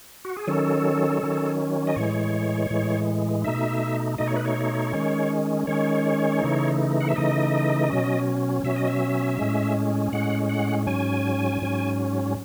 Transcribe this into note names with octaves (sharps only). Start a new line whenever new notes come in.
F#4
G#4
D#3 F#3 C#4 A4
D#3 F#3 C#4
D#5
A2 E3 G#3 C#5
A2 E3 G#3
B2 A3 D#4 E5
B2 A3 D#4 D#5
C#5
B4
C#5
D#3 G#3 C#4
D#3 G#3 C#4 C#5
C#3 E3 A3 D#4
F#5
E5
C#3 E3 A3 D#4 D#5
B2 F#3 C#4
B2 F#3 C#4 E5
D#5
E5
A2 G#3 C#4
A2 G#3 C#4 F#5
F#5
G#2 F#3 C#4 G#5
G#2 F#3 C#4